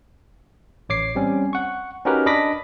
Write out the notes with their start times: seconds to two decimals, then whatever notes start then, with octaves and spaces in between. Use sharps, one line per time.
0.89 A1 C#5 D6 C7
1.15 G3 C4 C#4
1.53 F#5 C#6
2.05 C#4 D#4 F#4 G4 A#4 B4
2.26 D4 D#5 B5 D6 A#6 B6